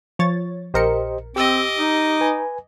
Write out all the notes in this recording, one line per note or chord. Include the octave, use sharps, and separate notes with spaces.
F3 C#5 A6
A#1 G4 A#4 C5 D#5 C#7
C4 G4 D#5 D6 E6
D#4
B4 G#5